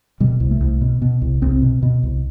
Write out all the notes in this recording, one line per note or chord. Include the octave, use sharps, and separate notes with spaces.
B2 G3
C2
A3
C2
B2
B2
C2
C2 C4
B2
B2
C2